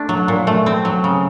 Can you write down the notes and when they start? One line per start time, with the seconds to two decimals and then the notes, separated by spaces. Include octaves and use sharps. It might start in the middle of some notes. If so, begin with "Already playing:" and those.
Already playing: A3 D4
0.09 F#3
0.28 A#2
0.47 A3
0.66 C4
0.85 F#3
1.04 C#3